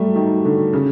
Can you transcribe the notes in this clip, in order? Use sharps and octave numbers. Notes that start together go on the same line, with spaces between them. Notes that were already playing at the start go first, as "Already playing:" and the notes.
Already playing: F#3 G3 A3
D#3
D3
C#3